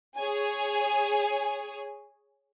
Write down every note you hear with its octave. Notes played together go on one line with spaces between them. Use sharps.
G#4 C#5 G#5